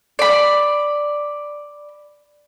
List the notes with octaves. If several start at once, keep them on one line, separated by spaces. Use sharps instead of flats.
D5 B5